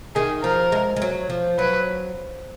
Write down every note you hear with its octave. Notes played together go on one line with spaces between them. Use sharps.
D#3 G#4
F3 A#4
G#3
G#3
F#3
F3
F#3 B4